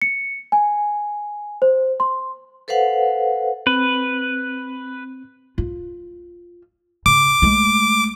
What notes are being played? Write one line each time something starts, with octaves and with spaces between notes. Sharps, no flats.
C#7
G#5
C5
C6
A4 B4 C5 F5 F#5
C4 B4
F4
C#3 D6
G#3 A3